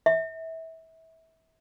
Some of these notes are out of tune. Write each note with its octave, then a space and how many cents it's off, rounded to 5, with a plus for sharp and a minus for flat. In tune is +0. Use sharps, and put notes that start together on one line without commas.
E5 -25